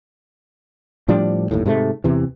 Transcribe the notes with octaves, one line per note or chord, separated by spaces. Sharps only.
A2 F3 G3 D4
G1 D#2 A2
G#2 C3 G#3 A3
E2 C3 E3